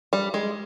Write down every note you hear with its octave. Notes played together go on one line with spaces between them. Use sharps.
G3
G#3